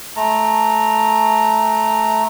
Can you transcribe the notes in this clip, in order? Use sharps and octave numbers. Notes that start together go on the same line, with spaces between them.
A3 A#5